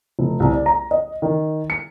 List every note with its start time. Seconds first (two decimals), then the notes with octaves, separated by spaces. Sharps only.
0.19 F1
0.40 C2
0.53 D5
0.66 A#5
0.91 D#5
1.22 D#3
1.70 C#7